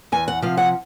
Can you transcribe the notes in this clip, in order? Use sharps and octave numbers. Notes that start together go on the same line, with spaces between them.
E2 G#5
F#5
C3 F3 F5
F#5